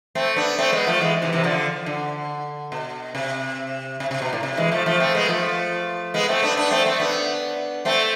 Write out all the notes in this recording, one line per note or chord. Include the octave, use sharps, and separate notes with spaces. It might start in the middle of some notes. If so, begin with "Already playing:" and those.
A3 C4
B3 D4
A3 C4
G#3 B3
F3 A3
E3 G#3
C3 E3
C3 E3
D3 F3
D3
B2
C3
C3
C3
B2
A2
C3
E3 G#3
F3 A3
F3 A3
A3 C4
G#3 B3
F3 A3
G#3 B3
A3 C4
B3 D4
B3 D4
A3 C4
A3 C4
B3 D4
A3 C4